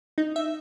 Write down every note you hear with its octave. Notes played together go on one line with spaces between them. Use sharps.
D#4
E5